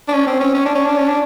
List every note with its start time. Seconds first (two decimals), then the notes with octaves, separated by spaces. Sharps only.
0.08 D4
0.13 C#4
0.27 C4
0.40 C#4
0.54 C#4
0.66 D4
0.75 C#4
0.86 D4
0.97 C#4
1.08 D4